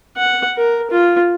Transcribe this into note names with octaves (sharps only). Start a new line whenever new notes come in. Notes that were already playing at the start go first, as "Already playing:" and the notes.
F#5
A#4
F4